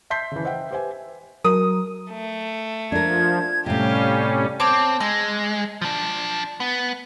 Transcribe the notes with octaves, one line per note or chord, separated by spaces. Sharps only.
E5 A5 C6 G6 B6 C7
C#3 E3
C5 D#5 E5 F#5 G5
G4 B4 C5 E5 G#5
F#3 A#4 D#6
A3
F3 D4 A#4 G#6
A2 C3 G3 C#4 G4 F5
C4 C#5 A5 D6
G#3 E6
F3 D4
B3